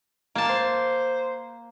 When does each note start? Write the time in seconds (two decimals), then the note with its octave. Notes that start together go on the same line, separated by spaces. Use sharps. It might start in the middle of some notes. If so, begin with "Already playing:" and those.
0.35 A#3 A5
0.50 C5